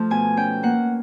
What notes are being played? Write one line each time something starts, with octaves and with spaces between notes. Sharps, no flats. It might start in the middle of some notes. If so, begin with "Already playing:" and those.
Already playing: F3 A3
B2 G#5
C#4 G5
A#3 F#5